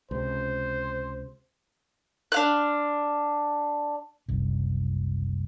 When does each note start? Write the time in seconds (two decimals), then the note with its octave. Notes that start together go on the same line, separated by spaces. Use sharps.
0.11 C#2 C3 C5
2.32 D4 F5 F#6
4.28 F#1 C2